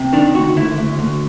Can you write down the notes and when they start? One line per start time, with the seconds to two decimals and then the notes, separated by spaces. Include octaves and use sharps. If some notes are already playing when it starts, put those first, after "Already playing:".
Already playing: C3
0.13 D#3 D4
0.34 D2 F#4
0.57 D2 E4
0.78 D2
0.99 D2